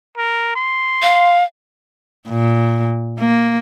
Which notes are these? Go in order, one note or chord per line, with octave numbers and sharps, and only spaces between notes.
A#4
C6
F5
A#2
A#3